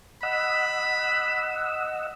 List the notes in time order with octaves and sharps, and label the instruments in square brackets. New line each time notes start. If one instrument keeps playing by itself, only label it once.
[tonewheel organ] D#5 F#5 E6 [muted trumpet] B5